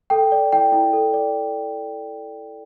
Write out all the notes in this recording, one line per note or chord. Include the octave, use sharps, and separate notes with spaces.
A4 G5
D5
E4 G5
E4
A4
D5